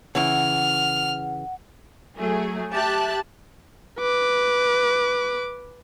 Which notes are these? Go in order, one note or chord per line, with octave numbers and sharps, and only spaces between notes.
C#3 E3 F#5 F6
F#3 A3 G#4
G4 E5 A5 F#6
B4 D6